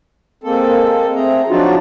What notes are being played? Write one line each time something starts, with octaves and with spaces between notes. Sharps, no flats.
G#3 A#3 C4 A4
A3 C4 G#4 A#5
F3 F#3 D4 D#4 F4 F#4